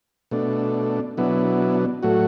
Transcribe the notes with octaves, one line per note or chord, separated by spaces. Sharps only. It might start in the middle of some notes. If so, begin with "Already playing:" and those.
B2 A3 D4
B2 F#3 B3 D4 E4
A2 F#3 A3 F#4